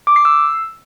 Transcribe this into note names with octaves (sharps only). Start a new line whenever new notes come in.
D6
C7
E6